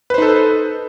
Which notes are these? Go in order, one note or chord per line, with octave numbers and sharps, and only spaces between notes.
D#4 A4 B4 C5